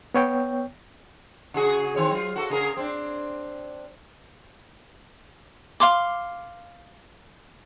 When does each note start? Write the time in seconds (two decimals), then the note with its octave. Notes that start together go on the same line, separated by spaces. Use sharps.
0.14 B3 C#5 G5
1.54 C#3 F#4 G#4
1.96 D#3 C4 C#5
2.11 F#3 F4
2.36 F#4 A4
2.50 C#3 G#4 A#4
2.77 C4 D4
5.80 F5 C6 D6